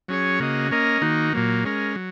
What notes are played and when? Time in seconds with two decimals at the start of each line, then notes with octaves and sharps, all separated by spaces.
0.08 F#3 C#4 G#4 C#5
0.40 C#3 A#3 F#4 D#5
0.71 A#3 C#4 A#4 D#5
1.02 D#3 A#3 D#4 F#4
1.33 A#2 F#3 A#3
1.65 G#3 C#4 A#4
1.95 F#3